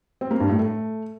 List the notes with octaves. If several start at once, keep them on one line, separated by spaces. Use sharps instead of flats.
C4
A#3
G2
A2
A3